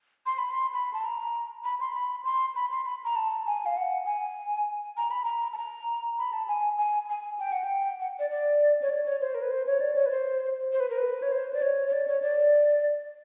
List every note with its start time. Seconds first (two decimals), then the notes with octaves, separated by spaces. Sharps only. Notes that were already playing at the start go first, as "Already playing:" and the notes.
0.26 C6
0.38 B5
0.51 C6
0.73 B5
0.93 A5
1.05 A#5
1.64 B5
1.80 C6
1.94 B5
2.25 C6
2.55 B5
2.71 C6
2.85 B5
3.04 A#5
3.16 A5
3.46 G#5
3.66 F5
3.77 F#5
4.06 G#5
4.97 A#5
5.11 B5
5.24 A#5
5.53 A5
5.57 A#5
6.18 B5
6.32 A5
6.48 G#5
6.78 G#5
7.09 G#5
7.39 G5
7.52 F#5
7.64 G5
8.00 F#5
8.19 D5
8.30 D5
8.82 C#5
8.89 D5
9.06 C#5
9.21 C5
9.34 A#4
9.42 B4
9.51 C5
9.66 C#5
9.80 D5
9.95 C#5
10.06 B4
10.11 C5
10.72 C5
10.80 B4
10.90 A#4
10.98 B4
11.22 C#5
11.32 C5
11.53 D5
11.62 C#5
11.87 C#5
11.93 D5
12.07 C#5
12.22 D5